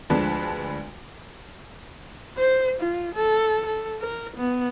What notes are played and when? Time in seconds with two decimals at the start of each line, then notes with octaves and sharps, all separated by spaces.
0.10 D2 D3 F3 G#3 B4 A5
2.37 C5
2.80 F4
3.15 A4
3.66 A4
4.01 A#4
4.36 B3